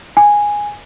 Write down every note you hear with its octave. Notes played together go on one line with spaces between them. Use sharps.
G#5